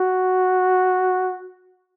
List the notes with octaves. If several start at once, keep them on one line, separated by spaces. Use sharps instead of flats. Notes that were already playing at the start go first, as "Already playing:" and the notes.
Already playing: F#4